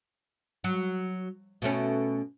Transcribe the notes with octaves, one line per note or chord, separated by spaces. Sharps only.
F#3
B2 A3 C#4